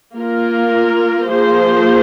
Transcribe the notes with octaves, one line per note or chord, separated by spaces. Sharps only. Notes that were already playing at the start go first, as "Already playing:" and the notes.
A#3 F4 A#4
F3 A#3 G#4 C5